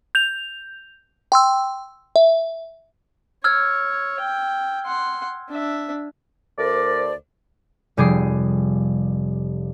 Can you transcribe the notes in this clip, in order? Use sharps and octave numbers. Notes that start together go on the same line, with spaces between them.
G6 F7
G5 C6 E6
E5
C#5 E6 F6 G#6
G5
F#5 C6
D4 E5
D2 A3 A#4 C5 D5
F1 G3 G#4 D6 C7